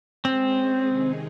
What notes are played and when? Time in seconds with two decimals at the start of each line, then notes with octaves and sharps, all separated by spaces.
0.25 G#3 C4 C#4 G#4
0.86 C3 D#3 G#3 D#4 G#4